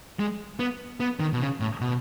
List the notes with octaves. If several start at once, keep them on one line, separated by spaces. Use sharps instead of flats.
G#3
B3
B3
D#3
B2
C#3
A2
B2